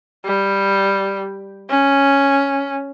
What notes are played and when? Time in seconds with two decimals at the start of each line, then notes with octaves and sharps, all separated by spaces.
0.25 G3
1.70 C#4